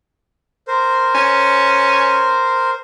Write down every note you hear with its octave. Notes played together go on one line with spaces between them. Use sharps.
A#4 C5
C#4